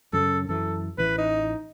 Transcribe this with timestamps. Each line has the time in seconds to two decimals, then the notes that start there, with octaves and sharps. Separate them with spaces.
0.13 F#2 C#3 A4
0.49 F#2 E3 A4
0.98 A1 E3 B4
1.18 D#4